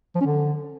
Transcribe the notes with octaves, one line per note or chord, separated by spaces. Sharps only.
F3
C#4
D3